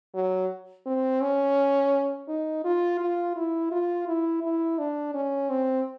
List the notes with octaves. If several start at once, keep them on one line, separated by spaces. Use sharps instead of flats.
F#3
C4
C#4
D#4
F4
F4
E4
F4
E4
E4
D4
C#4
C4